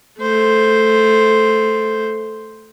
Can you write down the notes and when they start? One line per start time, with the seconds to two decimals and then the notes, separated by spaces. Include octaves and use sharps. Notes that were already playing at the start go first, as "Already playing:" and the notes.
0.20 A3 C5